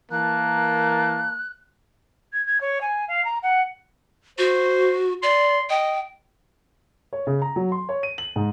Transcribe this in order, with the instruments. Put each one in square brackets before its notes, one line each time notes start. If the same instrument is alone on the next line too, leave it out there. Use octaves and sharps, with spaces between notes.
[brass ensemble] E3 A#4 A5 [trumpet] A#3 [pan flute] F#6
[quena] G#6
G#6
C#5
G#5
F5
A#5
F#5
[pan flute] F#4 [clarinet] C5
[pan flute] D5 [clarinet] C6
[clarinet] D#5 [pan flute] G5
[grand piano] C#5
C#3
A#5
F#3
C6
C#5
D#7
F#7
G#2